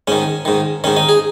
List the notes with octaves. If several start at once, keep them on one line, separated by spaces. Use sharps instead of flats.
G#2 D#3 C#4
G#2 D#3
G#2 D#3 C#4
D#4
G#4